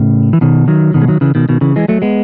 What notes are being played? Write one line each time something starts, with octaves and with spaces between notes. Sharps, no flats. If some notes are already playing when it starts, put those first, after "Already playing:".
Already playing: A2 C#3
E3
B2 D#3
D#3 F#3
B2 D#3
G#3
D#3 F#3
C#3 E3
B2 D#3
B2 D#3
C#3 E3
E3 G#3
F#3 A3
G#3 B3